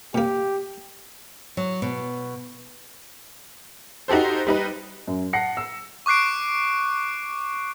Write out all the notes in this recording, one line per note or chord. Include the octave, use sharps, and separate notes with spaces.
A#2 A#3 G4
F#3
B2
D#4 F#4 G4 A4 C5
G3 D#4 B4
F#2
F#5 A5 A#6 C7 C#7
E6
C#6 D6 F#6 C7 D7